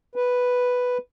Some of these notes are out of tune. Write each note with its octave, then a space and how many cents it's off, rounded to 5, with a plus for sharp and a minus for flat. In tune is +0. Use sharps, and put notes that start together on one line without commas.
B4 +0